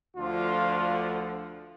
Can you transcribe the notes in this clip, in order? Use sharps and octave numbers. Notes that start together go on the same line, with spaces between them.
D2 D3 F3 F4